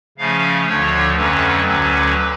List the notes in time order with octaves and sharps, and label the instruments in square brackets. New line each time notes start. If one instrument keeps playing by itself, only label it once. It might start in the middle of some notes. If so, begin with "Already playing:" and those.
[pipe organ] C#3 F3 A3 C#4 F5
D2 D3 F3 A3 D4 C#5
F2 D3 F#3 A3 C#4 B4
D2 D3 F#3 C#4